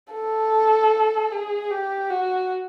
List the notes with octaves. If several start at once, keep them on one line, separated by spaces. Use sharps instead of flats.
A4
G#4
G4
F#4